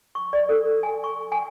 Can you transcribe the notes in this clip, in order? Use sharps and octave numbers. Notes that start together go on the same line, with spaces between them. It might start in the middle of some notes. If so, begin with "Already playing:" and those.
C#6
D5
A4
G#5
C#6
G#5